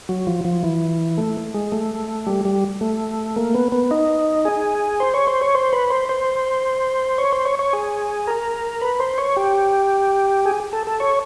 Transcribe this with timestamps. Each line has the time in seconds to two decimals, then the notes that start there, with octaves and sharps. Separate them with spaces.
0.09 F#3
0.27 F3
0.45 F3
0.63 E3
1.18 A3
1.54 G#3
1.72 A3
2.27 G3
2.45 G3
2.81 A3
3.36 A#3
3.54 B3
3.72 B3
3.91 D#4
4.45 G#4
5.00 C5
5.14 C#5
5.27 C5
5.41 C#5
5.55 C5
5.73 B4
5.90 C5
6.09 C5
7.18 C#5
7.32 C5
7.45 C#5
7.59 C#5
7.73 G#4
8.27 A#4
8.81 B4
9.00 C5
9.18 C#5
9.37 G4
10.46 G#4
10.73 A4
10.87 A4
11.00 C#5